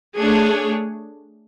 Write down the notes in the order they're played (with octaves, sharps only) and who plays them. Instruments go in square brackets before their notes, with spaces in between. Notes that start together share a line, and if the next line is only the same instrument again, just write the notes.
[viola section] A3 D4 G#4 C#5